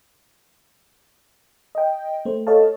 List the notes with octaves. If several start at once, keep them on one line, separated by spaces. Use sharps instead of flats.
D#5 G5
A3 C5
A4 C#5 D#5 F5 A5